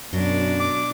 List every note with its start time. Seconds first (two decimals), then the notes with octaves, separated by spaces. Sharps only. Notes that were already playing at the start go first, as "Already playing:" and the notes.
0.13 F#2 B2 F#3 D4
0.60 D6